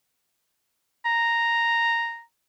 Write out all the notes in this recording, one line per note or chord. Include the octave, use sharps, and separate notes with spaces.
A#5